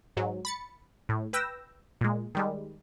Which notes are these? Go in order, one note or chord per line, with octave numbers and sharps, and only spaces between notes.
G#2 F#3
B5 A6 C#7
A2
B4 G5 E6 A#6
A#2 G#3
D#3 G3 G#3